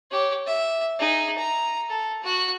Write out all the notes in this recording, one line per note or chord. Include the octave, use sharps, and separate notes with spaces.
G4 C#5
E5
D#4 G#4
A#5
A4
F#4 F#6